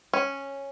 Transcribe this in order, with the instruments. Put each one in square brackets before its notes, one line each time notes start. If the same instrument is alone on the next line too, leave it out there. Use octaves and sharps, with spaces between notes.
[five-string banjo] C#4